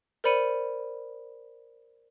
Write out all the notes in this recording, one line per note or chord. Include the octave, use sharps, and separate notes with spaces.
A#4 C5 D5 B5 C#7 D#7